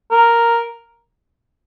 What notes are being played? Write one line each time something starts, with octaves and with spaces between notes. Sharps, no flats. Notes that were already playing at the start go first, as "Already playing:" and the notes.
A#4